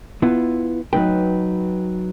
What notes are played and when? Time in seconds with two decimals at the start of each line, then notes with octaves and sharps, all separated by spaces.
0.22 B3 E4 F4
0.93 F#3 D#4 B4 G5